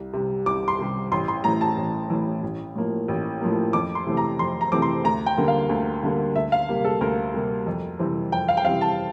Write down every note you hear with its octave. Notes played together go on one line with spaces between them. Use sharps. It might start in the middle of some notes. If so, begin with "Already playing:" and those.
Already playing: C2
C3 G3
C2 D6
C6
C3 G3
A1 C6
C6
A2 E3 A#5
A5
A1
A2 E3
A1
A2 F3 A#3
A1
A2 F3 A#3
F2 D6
C6
C3 E3 A3 C4
A#5
F2 C6
A#5
C3 E3 A3 C4 D6
C6
D2 A#5
G5
D3 G3 A#3
F5
D2
D3 G3 A#3
D2 E5
F5
C3 G3 A#3
A4
D2 A#4
C3 G3 A#3
F2
C3 E3 G3 C4
F2 G5
F5
G5
C3 E3 G3 C4 F5
A5